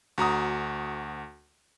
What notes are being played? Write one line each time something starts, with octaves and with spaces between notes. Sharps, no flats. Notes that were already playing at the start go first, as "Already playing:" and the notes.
D2 F#4 A#5 D#6